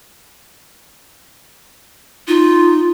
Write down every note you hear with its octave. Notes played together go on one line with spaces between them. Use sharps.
D#4 F4